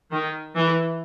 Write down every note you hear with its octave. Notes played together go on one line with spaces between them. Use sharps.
D#3
E3